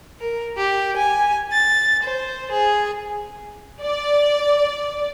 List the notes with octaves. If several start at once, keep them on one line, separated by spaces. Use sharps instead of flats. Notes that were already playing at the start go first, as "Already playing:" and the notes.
A#4
G4
G#5
A6
C5
G#4
D5